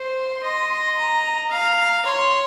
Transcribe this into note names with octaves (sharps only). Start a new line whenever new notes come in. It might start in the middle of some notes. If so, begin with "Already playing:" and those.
Already playing: C5 C6
D#5
A#5
F5
C#5 C6